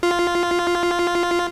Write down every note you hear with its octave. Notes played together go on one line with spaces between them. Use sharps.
F4